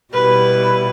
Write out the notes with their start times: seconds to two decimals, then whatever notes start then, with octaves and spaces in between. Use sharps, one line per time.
0.13 B2 G3 B3 E4 B4